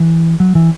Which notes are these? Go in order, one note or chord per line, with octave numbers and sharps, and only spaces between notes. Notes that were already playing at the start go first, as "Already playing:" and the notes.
Already playing: E3
F#3
E3